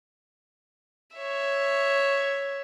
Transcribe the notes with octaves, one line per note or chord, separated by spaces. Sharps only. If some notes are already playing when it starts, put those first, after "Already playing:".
C#5 E5